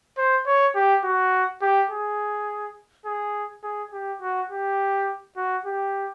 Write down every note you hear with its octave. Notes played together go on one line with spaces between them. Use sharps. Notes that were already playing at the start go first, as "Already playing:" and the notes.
C5
C#5
G4
F#4
G4
G#4
G#4
G#4
G4
F#4
G4
F#4
G4